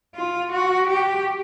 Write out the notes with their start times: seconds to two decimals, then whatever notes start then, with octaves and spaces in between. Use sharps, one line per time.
0.15 F4
0.52 F#4
0.88 G4